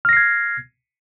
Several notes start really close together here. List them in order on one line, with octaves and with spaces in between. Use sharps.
F6 A#6 C7 G#6